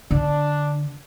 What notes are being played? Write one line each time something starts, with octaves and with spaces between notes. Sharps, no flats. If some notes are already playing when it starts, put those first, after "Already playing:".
D3 D4